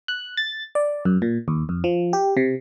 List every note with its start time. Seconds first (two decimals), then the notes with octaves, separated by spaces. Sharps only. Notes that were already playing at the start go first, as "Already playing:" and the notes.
0.08 F#6
0.37 A6
0.75 D5
1.05 F#2
1.22 A#2
1.48 D#2
1.69 F2
1.84 F3
2.13 G4
2.37 C3